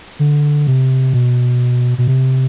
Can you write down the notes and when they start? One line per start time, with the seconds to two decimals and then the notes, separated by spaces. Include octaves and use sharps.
0.19 D3
0.67 C3
1.13 B2
1.98 B2
2.08 C3